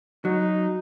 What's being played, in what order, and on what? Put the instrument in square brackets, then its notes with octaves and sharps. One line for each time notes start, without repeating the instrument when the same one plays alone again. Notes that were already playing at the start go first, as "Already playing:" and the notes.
[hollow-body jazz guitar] F#3 [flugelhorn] D#4